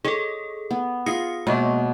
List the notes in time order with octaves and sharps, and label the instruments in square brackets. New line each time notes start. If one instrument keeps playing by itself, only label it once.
[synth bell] G#4 A4 [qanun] C#5 D#5
[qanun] B3
[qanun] F4 G#4 [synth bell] D#6 A#6 C#7
[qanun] B2 [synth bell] G#3 A#3 B3